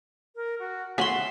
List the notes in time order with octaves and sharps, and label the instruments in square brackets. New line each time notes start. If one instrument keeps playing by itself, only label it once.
[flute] A#4
F#4
[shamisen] A3 C#4 F#4 [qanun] E5 B5 C6 [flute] F#5